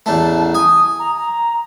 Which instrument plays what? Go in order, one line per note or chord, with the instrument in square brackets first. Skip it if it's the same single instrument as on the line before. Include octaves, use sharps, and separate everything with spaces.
[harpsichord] A1 E2 A3 [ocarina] A5
[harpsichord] G#5 [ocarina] D#6
[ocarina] A#5
A#5